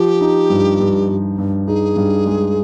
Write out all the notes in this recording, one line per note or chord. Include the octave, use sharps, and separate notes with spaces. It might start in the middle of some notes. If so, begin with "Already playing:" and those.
Already playing: F3 G4
D#4
G2
G2
G2
G2
D#4 G#4
G2
G#3